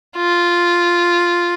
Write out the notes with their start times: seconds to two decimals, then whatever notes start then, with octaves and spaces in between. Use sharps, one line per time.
0.17 F4